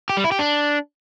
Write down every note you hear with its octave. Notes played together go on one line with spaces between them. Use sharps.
G4
G3
E4
G4
D4